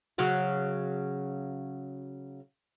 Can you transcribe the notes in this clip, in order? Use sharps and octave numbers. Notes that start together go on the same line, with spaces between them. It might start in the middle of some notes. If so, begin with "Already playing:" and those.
C#3 F#3 F#4